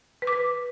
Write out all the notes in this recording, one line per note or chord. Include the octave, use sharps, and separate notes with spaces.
B4
D6
B4